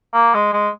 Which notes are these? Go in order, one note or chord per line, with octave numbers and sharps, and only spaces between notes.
A#3
G#3
G#3